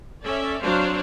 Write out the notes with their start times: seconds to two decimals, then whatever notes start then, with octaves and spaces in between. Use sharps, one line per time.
0.24 C#4 A4 D5 E5
0.63 F#3 C4 D4 C5 C#5 F5